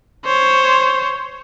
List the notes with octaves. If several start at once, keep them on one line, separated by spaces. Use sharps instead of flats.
C5 C#5